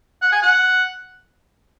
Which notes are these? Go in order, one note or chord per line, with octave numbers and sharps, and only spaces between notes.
F#5
G#5
F#5